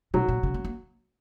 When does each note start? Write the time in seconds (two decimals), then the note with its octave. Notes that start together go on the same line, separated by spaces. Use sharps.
0.14 B2 F#3
0.29 A#2
0.43 C#3
0.54 A#3
0.65 A#3